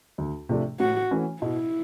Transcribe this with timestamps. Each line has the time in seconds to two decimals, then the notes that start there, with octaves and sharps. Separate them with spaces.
0.18 D2
0.49 C3 F3 A3 D4
0.80 A2 F#4
1.11 E3 A3 C#4 F#4
1.42 B2 E4